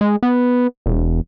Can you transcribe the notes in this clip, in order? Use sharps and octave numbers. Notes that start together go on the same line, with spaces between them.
G#3
B3
E1